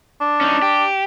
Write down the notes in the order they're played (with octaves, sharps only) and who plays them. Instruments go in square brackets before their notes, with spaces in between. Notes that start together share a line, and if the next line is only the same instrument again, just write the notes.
[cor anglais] D4
[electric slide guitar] C#4 D#4
G4